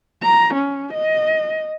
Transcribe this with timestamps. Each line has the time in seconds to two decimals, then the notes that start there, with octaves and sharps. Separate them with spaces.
0.23 A#5
0.54 C#4
0.94 D#5